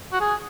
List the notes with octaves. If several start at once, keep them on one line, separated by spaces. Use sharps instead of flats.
F#4
G#4